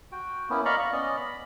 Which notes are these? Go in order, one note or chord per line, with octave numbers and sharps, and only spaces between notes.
F#4 G5
A#3 B3 C#4 E4
D5 D#5 F5 A#5 B5 C#6
C#6
B3 C#4 D5 D#5
B5